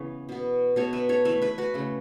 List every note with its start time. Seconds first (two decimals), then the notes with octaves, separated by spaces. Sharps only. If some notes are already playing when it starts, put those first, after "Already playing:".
Already playing: C#3 E3 B3 C#5
0.29 B2 B3
0.76 B2 F#3 B3 A4 C#5
0.93 B4 E5
1.09 A4 C#5
1.25 E3 A3 B4 E5
1.42 B4 E5
1.58 F#4 B4
1.74 C#3 A3